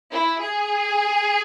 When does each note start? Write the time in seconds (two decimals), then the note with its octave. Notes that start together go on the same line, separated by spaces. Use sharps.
0.11 E4
0.42 G#4